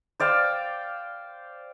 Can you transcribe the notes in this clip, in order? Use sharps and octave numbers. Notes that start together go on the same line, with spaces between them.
C5 D5 F5 G5